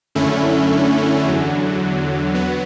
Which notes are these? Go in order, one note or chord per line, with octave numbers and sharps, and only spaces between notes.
F#2 D3 A3 C#4 E4
E2 D3 F#3
F#3 B3